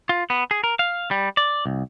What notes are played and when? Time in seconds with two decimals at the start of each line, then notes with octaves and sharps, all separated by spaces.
0.09 F4
0.30 B3
0.51 G#4
0.64 A#4
0.79 F5
1.11 G3
1.37 D5
1.66 C2